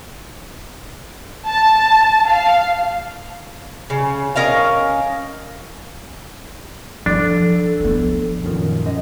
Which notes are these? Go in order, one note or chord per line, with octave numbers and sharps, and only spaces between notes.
A5
F5
C#3
C#4 A#4 D#5 F5
F3 D4 A4
F3 B3
F#2 A#2 D#3
F#2 F3 D#5